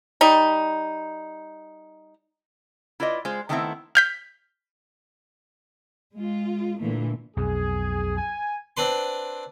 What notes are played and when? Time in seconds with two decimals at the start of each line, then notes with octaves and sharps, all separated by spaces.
0.21 G3 D#4
3.00 E4 F4 B4 D5 D#5
3.25 G#3 F4 C5
3.49 D#3 G3 A3 B3 C4 E4
3.95 F6 G6 B6
6.14 G#3 F4
6.79 A#2 D3 E3 A3 A#3
7.37 B1 F2 G#4
8.18 G#5
8.77 C4 D4 B4 C6